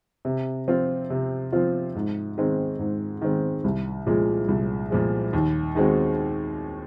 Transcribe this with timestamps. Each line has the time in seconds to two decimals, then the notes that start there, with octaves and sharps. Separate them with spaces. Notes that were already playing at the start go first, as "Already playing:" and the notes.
0.25 C3
0.68 F3 C4 F4
1.10 C3
1.52 F3 C4 F4
1.95 G#2
2.38 D#3 G#3 C4
2.79 G#2
3.21 D#3 G#3 C4
3.64 C2
4.06 A#2 F3 G#3
4.48 C2
4.90 A#2 F3 G#3
5.33 D#2
5.75 D#3 G#3 C4 F#4